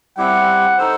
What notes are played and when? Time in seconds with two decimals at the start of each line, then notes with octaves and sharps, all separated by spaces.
0.17 G3 C4 E4 G4 F#5
0.78 D#4 A4 C5